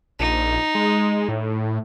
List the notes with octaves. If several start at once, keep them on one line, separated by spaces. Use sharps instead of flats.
A#1 D#4
G#3
A2